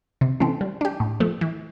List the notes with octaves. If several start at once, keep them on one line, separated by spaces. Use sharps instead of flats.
C3
E3 A3 C4
G3
D4 G4
A2
F3 A3
E3